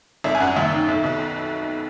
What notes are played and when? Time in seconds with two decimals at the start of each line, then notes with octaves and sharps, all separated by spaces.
0.24 G#1 E5
0.35 G#5
0.40 F#2 F#5
0.56 D#2 E5
0.72 D#3
0.88 B1
1.04 B2